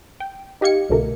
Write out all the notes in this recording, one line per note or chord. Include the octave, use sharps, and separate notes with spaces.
G5
D#4 G4 D#5 F5 G#6 C#7
C2 B2 D3 A3 A#4